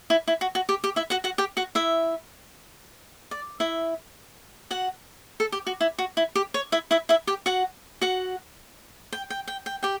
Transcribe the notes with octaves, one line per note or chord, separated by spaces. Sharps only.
E4
E4
F#4
F#4
G4
G4
E4 E5
F#4 F#5
F#4 F#5
G4 G5
F#4 F#5
E4 E5
D5
E4 E5
F#4 F#5
A4
G4
F#4
E4
F#4
E4
G4
C#5
E4 E5
E4 E5
E4 E5
G4 G5
F#4 F#5
F#4 F#5
G5
G5
G5
G5
G4 G5